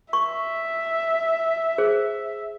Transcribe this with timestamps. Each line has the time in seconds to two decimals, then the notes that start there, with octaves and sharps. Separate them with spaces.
0.13 E5 C#6
1.78 G#4 C5